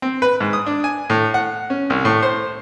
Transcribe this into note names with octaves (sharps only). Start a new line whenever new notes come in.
C4
B4
G#2
D#6
D4
G#5
A2
F#5
C#4
C2
A2
C5